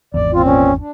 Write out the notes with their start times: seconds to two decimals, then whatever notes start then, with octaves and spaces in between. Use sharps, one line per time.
0.14 G#1 E2 D5
0.32 A#2 C4 F4
0.45 C#4
0.79 D4